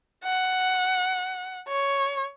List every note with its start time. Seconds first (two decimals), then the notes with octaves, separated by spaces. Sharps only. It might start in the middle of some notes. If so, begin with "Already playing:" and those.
0.24 F#5
1.68 C#5